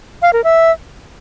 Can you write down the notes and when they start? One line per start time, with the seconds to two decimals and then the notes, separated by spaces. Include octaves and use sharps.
0.22 F5
0.33 A#4
0.44 E5